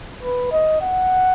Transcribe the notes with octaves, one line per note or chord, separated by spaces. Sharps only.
B4
D#5
F#5